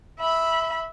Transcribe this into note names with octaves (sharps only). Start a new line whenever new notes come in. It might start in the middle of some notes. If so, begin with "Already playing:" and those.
E5 B5